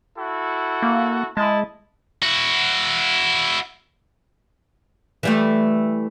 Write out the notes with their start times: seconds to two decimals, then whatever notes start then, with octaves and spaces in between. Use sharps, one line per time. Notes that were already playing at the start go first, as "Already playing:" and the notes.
0.18 E4 F#4 A4
0.83 A#3
1.37 G#3 E4 D#5 A5
2.22 E4 F#4
5.23 E3 G3 A3